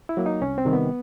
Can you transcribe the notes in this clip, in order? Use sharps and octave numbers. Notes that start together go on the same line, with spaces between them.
E4
F#3 A#3
D#4
C2 C#4
C4
C3 D#3 G3
B3